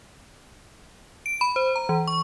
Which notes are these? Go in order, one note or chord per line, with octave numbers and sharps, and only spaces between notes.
D7
B5
C5
A#5
E3
C#6